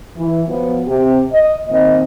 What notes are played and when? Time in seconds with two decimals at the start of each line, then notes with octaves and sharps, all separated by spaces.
0.17 E3
0.49 F3 F#3 B3
0.87 C3 G4
1.33 D#5
1.68 A#2 D#3 C4 D#5